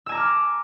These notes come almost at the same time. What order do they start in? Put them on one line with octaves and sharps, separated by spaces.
E6 G#5 A#5 D6 F6